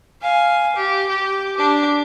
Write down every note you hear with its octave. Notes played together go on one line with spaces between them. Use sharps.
F5 G#5
G4
G4
D4 G4